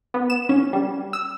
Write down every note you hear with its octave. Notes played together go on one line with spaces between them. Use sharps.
B3
E7
C#4
G3
E6